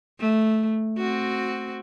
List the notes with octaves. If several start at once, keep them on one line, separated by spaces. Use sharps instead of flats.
A3
C4 F#4